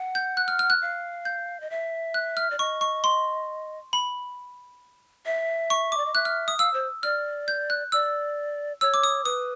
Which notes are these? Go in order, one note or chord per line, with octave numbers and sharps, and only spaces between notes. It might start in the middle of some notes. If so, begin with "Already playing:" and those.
Already playing: F#5
G6
F#6
F6
F6
F#6
F5
G6
D#5
E5
F#6
F6
D5
D#5 C#6
C#6
C6
B5
E5
C#6
D6
D5
D#5
E5 F#6
F6
D#6
F5 E6
C5
D5 F6
G6
F#6
D5 E6
C#5 E6
D6
D#6
B4 D#6